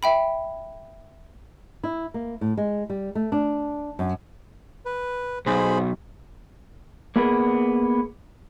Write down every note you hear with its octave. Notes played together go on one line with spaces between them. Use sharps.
E5 G5 B5
E4
A#3
A2
G#3
G3
A3
D4
F#2
B4
B1 G#4 C5 B5
A#3 B3 G#4